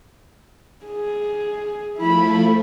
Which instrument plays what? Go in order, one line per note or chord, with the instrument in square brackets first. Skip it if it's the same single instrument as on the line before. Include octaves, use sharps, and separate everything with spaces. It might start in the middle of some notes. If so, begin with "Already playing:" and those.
[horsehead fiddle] G#4
[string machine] F3 A3 [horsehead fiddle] E4 B5